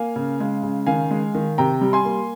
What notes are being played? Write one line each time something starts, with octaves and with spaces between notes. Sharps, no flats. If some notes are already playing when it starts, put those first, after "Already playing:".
Already playing: A#3 F5 G#5
C#3
G#3
C#3
D#3 F5 G#5
G#3
D#3
C3 G5 A#5
G3
G#5 C6
A#3